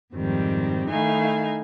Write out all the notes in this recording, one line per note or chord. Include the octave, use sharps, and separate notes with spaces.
F2 G#2 D#3 G3 C4
D#3 A3 D#4 E4 F5 G#5